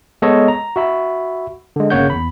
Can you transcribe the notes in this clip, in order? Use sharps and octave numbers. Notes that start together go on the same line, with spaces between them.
G#3 B3 A4 C#5 D#5
A#5
F#4 E5 B5
D3 G#3
G1 C#3 A#3 C#5 F#5 G6
E2 B5